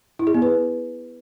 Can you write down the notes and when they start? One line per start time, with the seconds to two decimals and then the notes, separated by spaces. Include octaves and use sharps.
0.19 E4
0.27 G#4
0.34 B3
0.42 B4